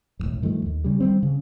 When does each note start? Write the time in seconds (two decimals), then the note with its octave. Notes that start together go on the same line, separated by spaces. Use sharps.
0.19 E1 A1 F2
0.42 G2 D#3 F3 A3
0.66 D#2
0.84 C#3 G3
1.00 D#3 G3 C4
1.23 C#3